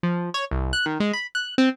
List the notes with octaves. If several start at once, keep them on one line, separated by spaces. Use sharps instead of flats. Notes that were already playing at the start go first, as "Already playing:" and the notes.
F3
C#5
C2
F#6
D#3
G#3
B5
F#6
C4